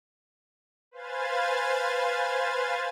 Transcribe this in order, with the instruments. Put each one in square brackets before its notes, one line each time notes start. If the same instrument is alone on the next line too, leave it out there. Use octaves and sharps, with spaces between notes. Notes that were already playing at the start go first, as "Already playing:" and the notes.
[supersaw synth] B4 C5 F5 G#5 G#6 A6